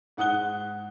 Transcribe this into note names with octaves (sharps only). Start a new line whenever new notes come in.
G#2 F#5 D#6 F#6 G7